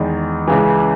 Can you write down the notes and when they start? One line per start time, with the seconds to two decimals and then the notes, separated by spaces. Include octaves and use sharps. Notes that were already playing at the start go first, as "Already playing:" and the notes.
Already playing: E2 D#3 G#3
0.48 C#2 C#3 E3